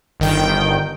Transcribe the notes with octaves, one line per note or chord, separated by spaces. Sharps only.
G1 D#3 G5